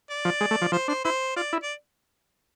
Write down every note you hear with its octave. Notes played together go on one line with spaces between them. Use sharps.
D5
F3
G#3
A3
F3
F3 C5
D4 C5
E4 C5
F4 D5
E4
D5